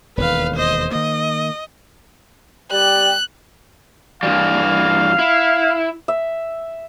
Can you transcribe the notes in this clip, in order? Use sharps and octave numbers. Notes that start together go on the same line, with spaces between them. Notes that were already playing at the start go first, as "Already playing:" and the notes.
E1 D#2 B4 F5
C5 D#5
D#3 A#3 D#5
G3 D5 G5 F#6
G2 E3 G3 F5
E4
E5